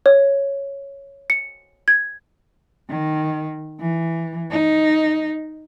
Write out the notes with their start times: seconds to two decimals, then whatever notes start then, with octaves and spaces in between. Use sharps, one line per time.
0.06 C#5
1.30 C#7
1.88 G#6
2.89 D#3
3.80 E3
4.51 D#4